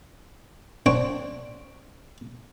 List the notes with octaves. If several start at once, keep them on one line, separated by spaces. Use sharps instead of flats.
D4 C5 C#5 F#5 G5